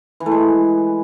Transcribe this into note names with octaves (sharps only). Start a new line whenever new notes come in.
E3
A3
G#3